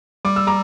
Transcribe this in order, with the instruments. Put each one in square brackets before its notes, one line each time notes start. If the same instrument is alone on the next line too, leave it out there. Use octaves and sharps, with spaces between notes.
[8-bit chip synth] G3 [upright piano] D6
[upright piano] E6
A#5 D6